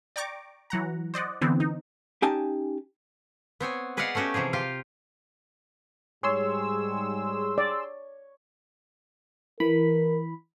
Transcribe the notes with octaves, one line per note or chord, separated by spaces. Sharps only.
D5 G5 A#5 C#6 D6
E3 F#3 F#5 A#5
C5 D5 D#5 F#5
D3 E3 B3 C4
D#4
C#4 D#4 G4 G#5 A5
B3 C4 C#5 G#5
G#4 B4 D5 D#5 F5 F#5
A3 B3 C#4 F#4 G4
C3 E3 F3 G#4
F4 G4 F5
G#2 G3 G#4 C#5 C6 E6
D5
E3 A#4 B5